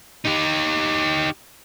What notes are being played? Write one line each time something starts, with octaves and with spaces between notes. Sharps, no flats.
D#4 G4